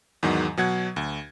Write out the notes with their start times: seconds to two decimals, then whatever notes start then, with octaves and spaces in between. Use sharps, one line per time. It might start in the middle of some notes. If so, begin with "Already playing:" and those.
0.23 E2 G#2 D#3 F#3
0.57 B2 F#3 F#5 G#6
0.96 D2